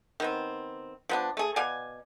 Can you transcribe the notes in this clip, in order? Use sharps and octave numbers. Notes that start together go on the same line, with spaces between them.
D#3 B3 C4
F3 B3 D4
A3 G#4
B2 D5 F5 G#5